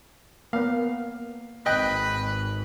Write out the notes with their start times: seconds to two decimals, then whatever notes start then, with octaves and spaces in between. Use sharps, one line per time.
0.53 A#3 B3 F5
1.66 G#1 B4 D#5 G5 F#6